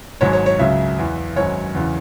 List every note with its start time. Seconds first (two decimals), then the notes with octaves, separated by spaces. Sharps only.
0.21 G#1 G#2 F#3 C#5
0.33 C#5
0.46 C#5
0.59 C#2 C#3 F#3 E5
0.98 E2 E3
1.36 G#1 F#2 F#3 C#5
1.74 E2 C#3 E3